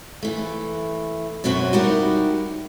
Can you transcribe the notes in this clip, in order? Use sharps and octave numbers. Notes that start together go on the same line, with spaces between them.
E3 A3
F#2 B2 C4 F#4 B4 C#5
G3 D#4 E4 F#4 G4 A#4